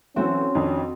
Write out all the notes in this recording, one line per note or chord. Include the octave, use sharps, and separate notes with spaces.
E3 F#3 A3 C4 C#4 F#4
F2 D#3 D4